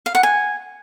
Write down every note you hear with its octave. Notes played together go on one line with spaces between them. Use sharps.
F5
F#5
G#5